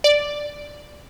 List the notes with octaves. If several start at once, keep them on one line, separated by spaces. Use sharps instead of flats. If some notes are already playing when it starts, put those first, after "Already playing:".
D5